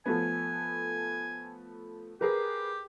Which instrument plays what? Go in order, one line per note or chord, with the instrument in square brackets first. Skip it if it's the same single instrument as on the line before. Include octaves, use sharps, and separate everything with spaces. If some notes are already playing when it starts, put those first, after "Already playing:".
[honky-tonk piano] F3 A3 B3 [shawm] G#5
[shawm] G4 [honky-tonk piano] G#4 A#4 B4